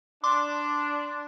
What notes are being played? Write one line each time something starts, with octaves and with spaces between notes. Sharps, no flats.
D4 C6 D6